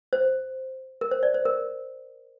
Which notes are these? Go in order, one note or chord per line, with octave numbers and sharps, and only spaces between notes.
C5
A#4
C5
D5
C5
A#4